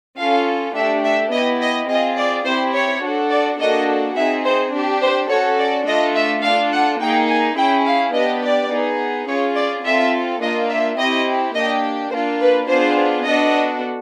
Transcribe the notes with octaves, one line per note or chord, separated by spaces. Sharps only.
C#4 F4 A4 F5
A3 D4 G4 E5
E5
B3 E4 G4 D#5
D#5
C4 F4 G#4 D#5
D5
C4 E4 G4 C5
C#5
D4 F#4 A4
D5
A#3 D4 F#4 A4 D#5
C4 D#4 G#4 E5
C5
D4 G4
C5
C#4 F#4 A4 C#5
D5
A3 D4 F4 A4 D#5
E5
D4 F4 A4 F5
F#5
A#3 D#4 G#4 G5
G#5
C#4 E4 G#4 G5
F5
B3 D4 G4 D#5
D5
B3 D#4 G#4
C#4 F4 G#4 C#5
D5
C4 F4 A4 E5
A#3 D4 F4 D#5
E5
C4 E4 G4 D#5
A#3 D4 G4 D#5
A#3 D4 F4 C5
B4
B3 D4 F4 G#4 C5
B3 D4 F#4 A4 D#5